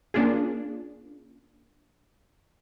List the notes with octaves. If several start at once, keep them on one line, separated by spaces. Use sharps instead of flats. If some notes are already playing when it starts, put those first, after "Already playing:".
A#3 C#4 D4 F4 G#4